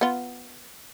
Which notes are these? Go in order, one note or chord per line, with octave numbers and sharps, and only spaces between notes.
B3 F4